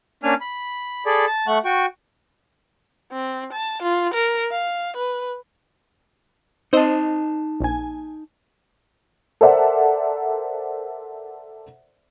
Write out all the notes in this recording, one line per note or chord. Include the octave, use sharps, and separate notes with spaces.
A#3 C#4 D4 G#5 F6
B5
G#4 A4 D5 B5
A5
A3 F#5 C#6 F#6
F#4 G5 C#6
C4
A5
F4
A#4
F5
B4
C4 D#4 C5 D#5 A5
A#1 G#5
A4 A#4 C5 D5 E5 F#5